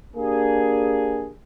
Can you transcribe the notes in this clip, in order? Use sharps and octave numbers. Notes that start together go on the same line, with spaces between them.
A#3 D4 G4 G#4